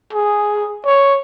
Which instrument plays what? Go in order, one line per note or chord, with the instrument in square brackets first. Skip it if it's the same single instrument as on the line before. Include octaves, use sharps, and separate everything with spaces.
[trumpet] G#4
C#5